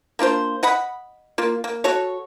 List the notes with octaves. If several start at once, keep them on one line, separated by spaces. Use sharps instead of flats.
A#3 D4 F4 C5
D#5 F#5 B5
A#3 F4
A#3
F#4 A4 C#5